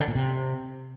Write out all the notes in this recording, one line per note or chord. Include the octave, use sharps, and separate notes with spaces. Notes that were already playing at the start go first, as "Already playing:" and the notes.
D3
A#2
C3